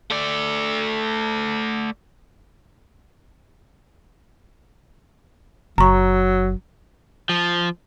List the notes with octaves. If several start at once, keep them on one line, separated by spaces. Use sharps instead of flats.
A3 D5
F#1 F#3 A#5 C#6
F3